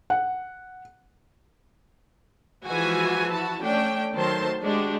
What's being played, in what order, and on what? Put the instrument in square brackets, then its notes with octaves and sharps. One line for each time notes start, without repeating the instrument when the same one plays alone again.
[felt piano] F#5
[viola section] E3 F3 G#3 F#4 G#5
E4 F#4 A5
A3 C#4 D4 G5
D#3 F#3 A3 C5 A5 C6
G#3 D4 F#4 G4